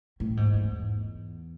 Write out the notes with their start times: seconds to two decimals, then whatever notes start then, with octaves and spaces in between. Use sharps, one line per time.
0.20 A2
0.37 G#2
0.54 E2